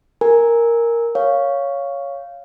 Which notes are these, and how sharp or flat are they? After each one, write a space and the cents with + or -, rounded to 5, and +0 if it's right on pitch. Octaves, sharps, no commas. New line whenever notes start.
A#4 +0 G#5 +0
C#5 +5 F5 +0